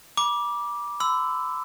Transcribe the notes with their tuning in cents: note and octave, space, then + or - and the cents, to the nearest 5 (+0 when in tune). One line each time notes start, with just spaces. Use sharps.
B5 -40 D6 +0
B5 +45 E6 +0